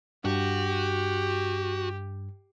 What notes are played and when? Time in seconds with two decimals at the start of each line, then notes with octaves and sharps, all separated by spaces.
0.25 G2 F#4 G4